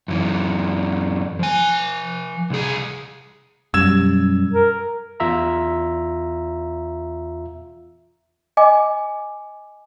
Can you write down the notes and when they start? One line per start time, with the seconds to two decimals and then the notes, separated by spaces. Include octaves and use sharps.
0.08 F#2 E3
1.39 F3 G#5
2.50 C2 G#4
3.74 F#2 B2 G3 E6 G#6 E7
4.52 A#4
5.20 E2 F4 E5 A#5
8.57 D#5 G#5 D6